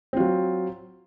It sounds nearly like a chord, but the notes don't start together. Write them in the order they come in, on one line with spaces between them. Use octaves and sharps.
C4 F4 F#3